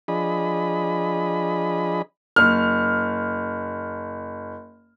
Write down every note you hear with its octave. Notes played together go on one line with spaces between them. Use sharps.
F3 D4 G#4 D#5 B5
F#1 F6